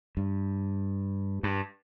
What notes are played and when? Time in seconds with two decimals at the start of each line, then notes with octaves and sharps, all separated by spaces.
0.17 G2
1.43 G2